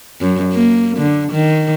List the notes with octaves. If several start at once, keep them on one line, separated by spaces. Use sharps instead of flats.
F#2
A#3
D3
D#3